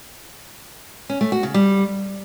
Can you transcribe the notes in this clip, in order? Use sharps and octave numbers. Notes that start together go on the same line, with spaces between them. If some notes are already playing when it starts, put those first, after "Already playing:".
C#4
A3
F#4
C#3
G3